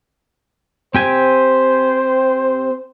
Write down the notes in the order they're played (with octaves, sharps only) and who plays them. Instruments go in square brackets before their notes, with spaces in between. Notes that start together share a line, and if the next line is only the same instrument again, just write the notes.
[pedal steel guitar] C4 G4 G#5 [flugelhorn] C5